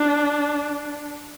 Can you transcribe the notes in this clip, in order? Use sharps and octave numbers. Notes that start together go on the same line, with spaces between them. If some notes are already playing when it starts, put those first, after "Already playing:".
Already playing: D4